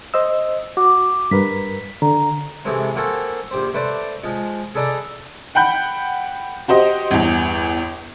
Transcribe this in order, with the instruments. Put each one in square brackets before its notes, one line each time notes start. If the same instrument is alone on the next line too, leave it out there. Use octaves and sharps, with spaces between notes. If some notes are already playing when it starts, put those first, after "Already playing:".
[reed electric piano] C5 D#5 E6
[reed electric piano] F#4 [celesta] D6
[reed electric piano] G2 A#4 B4 [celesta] B6
[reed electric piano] D3 [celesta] A#5
[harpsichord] C3 E3 G#3 A3 C4
A#3 C4 F#4 G#4 A4
A#1 G4 C5
A3 B4 C5 D5
F3 G#3
G#4 A4 B4 D5 D#5 A#5
[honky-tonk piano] F#5 G5 B5 G6
F#4 G4 C5 D#5
G1 E2